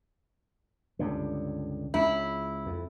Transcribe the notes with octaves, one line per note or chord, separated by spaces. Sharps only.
C#2 G2 D3
C#2 E4
F2